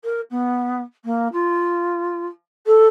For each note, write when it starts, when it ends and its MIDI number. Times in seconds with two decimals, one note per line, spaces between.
0.04 0.21 70
0.30 0.82 59
1.04 1.28 58
1.33 2.26 65
2.67 2.87 69